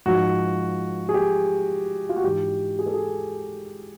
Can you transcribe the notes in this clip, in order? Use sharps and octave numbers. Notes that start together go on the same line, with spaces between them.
G#2 F3 F#4
G#4
G4
F4
F#4
G#2 E3 G4
G#4
A4
G#4